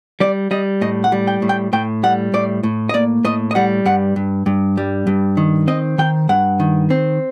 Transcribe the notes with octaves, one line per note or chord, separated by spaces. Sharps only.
G3 D5
G3 D#5
A2 D#5
F#5
G3
G5
A2
G5
A2 G5
G3 F#5
A2 D5
A2
D#5
A#3 D5
A2 D#5
D#5
G3 F#5
G2 F#5
G2
G2
G3
G2
D#3
C4 D#5
D#3 G5
G2 F#5
D#3
C4